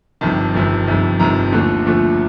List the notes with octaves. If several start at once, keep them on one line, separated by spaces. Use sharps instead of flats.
G1 F2 C3 D#3 A5
G1 F2 C3 D#3
G1 F2 C3 D#3
G1 F2 C3 D#3 A#5
D#2 D3 F3 A3
D#2 D3 F3 A3